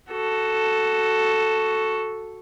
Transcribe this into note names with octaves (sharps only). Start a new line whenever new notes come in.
F#4 A4